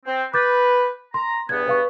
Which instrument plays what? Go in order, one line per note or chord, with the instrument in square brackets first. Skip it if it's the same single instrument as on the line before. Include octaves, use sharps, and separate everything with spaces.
[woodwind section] C4
[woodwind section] B4 [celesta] D6 G6 A6
[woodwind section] A#5 [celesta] C6
[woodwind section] E2 G2 B3 [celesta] G#6
[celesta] B4 F5 C#6